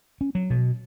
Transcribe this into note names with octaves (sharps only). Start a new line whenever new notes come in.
C#4
F#3
B2